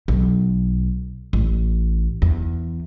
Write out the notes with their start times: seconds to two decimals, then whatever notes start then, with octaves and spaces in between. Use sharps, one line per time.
0.08 B1
1.33 A1
2.22 E2